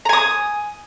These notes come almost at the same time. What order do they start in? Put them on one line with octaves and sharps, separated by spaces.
A#5 G#5 D#6